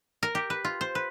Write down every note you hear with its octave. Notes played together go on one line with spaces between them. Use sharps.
A#4
G4
B4
F4
C5
B4